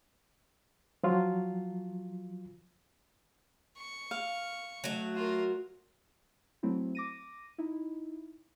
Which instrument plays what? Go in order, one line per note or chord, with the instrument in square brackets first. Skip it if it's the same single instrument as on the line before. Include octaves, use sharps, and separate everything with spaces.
[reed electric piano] F3 F#3 F4
[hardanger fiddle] C#6
[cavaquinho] F5
[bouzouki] F#3 F#4 [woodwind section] A3
[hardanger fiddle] F4 A#4
[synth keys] F#3 A3 C4 E4
D6 A#6 D#7
D#4 E4